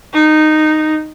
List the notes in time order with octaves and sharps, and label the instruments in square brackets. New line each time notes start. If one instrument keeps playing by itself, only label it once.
[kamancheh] D#4